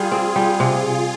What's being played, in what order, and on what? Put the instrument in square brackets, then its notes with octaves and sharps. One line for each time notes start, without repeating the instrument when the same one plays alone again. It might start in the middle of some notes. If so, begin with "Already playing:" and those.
Already playing: [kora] G3 [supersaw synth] F4 G#4
[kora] C4
G3
C3